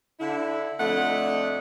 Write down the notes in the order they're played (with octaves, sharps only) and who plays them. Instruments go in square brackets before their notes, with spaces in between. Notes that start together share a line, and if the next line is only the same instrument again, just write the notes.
[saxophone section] D3 E4
F2 D3 A3 D#5 F#5